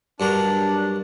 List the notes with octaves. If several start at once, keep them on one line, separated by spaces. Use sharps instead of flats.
G2 F#3 D4 A#4